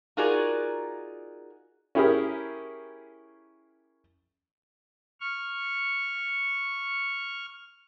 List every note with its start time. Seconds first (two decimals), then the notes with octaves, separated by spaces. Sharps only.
0.17 D#4 F4 F#4 G#4 A#4 D5
1.95 C#4 E4 G4 G#4 A#4
5.20 C#6 F6